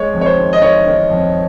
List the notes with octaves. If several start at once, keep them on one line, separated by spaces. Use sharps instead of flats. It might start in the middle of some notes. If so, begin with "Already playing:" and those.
Already playing: G#3 C#5
F2
C#5
C5
D#3
D#5
D#3 C#5
D#3
F2